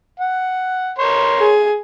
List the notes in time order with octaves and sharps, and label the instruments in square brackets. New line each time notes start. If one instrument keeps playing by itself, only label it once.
[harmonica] F#5
A#4 C#5 C6
[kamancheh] G#4